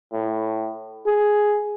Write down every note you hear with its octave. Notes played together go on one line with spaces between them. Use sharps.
A2
G#4